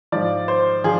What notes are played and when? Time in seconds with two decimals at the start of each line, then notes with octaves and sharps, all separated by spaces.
0.12 G#2 F3 D5
0.48 C5
0.84 F3 G#4